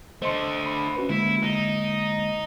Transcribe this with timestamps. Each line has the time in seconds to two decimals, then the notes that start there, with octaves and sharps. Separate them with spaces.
0.22 D3 A3 C5 D#5 C6
0.66 B5
0.97 C#4 F#4 B4
1.10 D3 G#3 A#3 E4
1.43 D#4